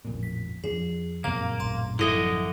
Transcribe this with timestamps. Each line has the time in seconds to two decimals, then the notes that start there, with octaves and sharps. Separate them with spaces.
0.05 A1 F2 A#2
0.23 B6
0.64 F2 F3 D4 G#4
1.24 F#2 A#2 A#3 C4 F5
1.60 A1 F5 C6
1.99 F#2 D3 F3 E4 A4 D#5 E5